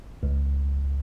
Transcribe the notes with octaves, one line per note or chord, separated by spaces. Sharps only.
C#2